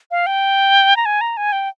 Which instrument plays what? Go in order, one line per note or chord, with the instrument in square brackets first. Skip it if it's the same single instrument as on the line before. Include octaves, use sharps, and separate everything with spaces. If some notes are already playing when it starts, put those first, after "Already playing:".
[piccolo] F5
G5
A#5
G#5
A#5
G#5
G5